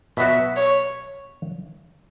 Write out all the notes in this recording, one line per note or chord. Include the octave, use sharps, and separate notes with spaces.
B2 F#3 B3 F#4 E5
C#5